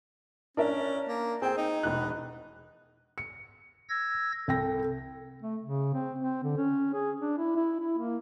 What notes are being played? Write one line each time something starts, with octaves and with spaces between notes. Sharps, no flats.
C#4 D4 A#4 E5
A#3
C4 G#4 G5
D#4
E1 E2 F#6
C#7
E6 G#6 A#6
C2 A4 G5 A#6
A3
C#3
C4
C4
D3
C#4
G#4
D4
E4
E4
E4
A#3